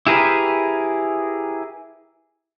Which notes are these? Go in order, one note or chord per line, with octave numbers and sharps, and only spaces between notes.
E4 G4 G#4 A#4 B4